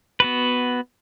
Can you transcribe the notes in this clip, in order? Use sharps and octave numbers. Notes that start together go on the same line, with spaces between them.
B3 F#4 B4